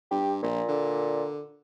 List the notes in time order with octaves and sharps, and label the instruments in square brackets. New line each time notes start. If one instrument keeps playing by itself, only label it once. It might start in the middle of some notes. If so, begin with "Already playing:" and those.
[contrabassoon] G2 [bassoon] G4
[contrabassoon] A#1 [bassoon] A#2
[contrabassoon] D3